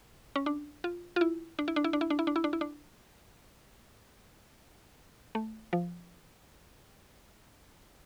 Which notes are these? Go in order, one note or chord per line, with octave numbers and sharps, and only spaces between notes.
C#4
D4
F4
F4
E4
D4
E4
D4
E4
D4
E4
D4
E4
D4
E4
D4
E4
D4
A3
F3